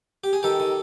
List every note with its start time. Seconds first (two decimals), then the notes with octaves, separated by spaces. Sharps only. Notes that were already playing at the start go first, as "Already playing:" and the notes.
0.24 G4
0.33 G#4
0.43 D#3 G4 A4
0.60 D#3